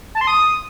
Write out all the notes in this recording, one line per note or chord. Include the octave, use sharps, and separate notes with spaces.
A5
C6
D#6